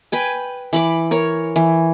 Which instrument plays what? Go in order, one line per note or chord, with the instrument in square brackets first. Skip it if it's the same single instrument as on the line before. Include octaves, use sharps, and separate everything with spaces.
[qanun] B4 G5 G#5
E3 B5 D6
A#4 C#5
E3